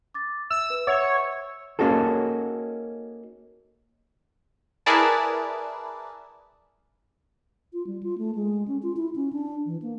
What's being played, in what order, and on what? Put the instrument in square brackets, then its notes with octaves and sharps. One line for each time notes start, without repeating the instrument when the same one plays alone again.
[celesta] D6 A6
[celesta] E5 [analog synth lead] E6
[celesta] B4
[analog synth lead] C#5 [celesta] E5 F#5 E6
[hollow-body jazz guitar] A#3 C#4 D#4 F#4 G#4 A4
[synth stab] E4 G#4 A#4 B4 D5 A5
[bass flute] F4
G3
F4
A3
G#3
C#4
F4
E4
C#4
D4
E3
A#3